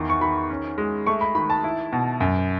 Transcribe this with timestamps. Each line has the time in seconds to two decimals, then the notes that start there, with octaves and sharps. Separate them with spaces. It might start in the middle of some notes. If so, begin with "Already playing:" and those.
Already playing: E2 D#3
0.10 C#6
0.21 D#3 B5
0.50 C#4
0.78 G#3
1.07 A3 C#6
1.21 B5
1.35 D#3 B5
1.50 A5
1.64 E4
1.93 B2
2.20 F#2